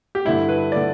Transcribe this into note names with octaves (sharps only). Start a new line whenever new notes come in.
G4
G2 D3 E4
B4
D3 D5